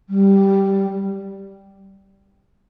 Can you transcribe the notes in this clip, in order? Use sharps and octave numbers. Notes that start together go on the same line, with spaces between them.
G3